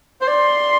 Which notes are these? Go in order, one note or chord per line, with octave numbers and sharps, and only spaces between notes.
C5
D5 C6